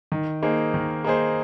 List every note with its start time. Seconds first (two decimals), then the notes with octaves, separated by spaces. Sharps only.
0.12 D#3
0.43 A#3 D#4 G#4 C5
0.74 D#3
1.04 A#3 D#4 G#4 C5